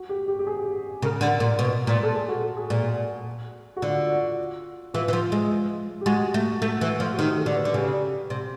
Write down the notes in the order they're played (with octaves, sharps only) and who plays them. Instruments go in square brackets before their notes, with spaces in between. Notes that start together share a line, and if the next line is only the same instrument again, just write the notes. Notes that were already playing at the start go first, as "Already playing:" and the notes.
Already playing: [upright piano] F#4
G4
G4
G4
G#4
[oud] C#3 [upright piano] A#4
[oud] D3
A#2
B2
A#2
[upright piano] A4
G#4
F#4
A4
G#4
[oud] A#2
[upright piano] F#4
[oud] D3 [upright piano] F4
[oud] E3 [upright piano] F4
[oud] E3
F3
G#3
[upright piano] G4
[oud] G#3 [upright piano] F#4
[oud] A3
A3
E3
F3
[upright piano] F#4
[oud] D#3 [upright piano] G4
[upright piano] A4
[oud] D3
[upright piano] B4
[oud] D3
[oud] C#3 [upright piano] G4
[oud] C3